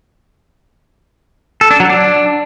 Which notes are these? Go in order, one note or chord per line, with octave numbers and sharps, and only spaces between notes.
A4
D4
F#3
D4